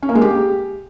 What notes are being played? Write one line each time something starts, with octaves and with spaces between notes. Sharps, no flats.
C#4
A#3
G#3
G4